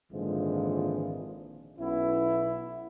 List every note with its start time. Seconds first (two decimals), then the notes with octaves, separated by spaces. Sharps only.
0.12 G#1 A#2 D3 E3 F3 G#3
1.79 B1 B3 C#4 E4